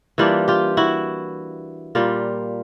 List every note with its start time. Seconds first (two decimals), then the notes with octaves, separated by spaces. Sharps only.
0.18 E3 G3 A#3 D4 F4
0.48 F4 G4
0.77 E4 F#4
1.95 A#2 G3 A#3 F4